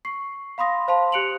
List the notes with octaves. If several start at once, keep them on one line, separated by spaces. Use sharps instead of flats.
C#6 C7
F5 B5 C6 D#6 A#6
C5 F5 A5 C6
G4 F#6 C#7 D7 F7 F#7